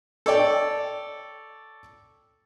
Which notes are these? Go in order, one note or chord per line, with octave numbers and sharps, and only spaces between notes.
A4 C#5 D5 G5